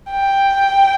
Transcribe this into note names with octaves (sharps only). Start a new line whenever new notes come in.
G5